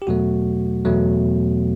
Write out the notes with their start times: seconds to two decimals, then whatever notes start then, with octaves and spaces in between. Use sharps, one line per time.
0.02 G4
0.07 E2 B2 F#3 A3 F#4
0.85 E2 B2 F#3 A3